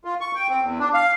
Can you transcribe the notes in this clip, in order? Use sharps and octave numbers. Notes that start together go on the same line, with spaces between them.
F4
C#6
G5
C4
E2
D4
F5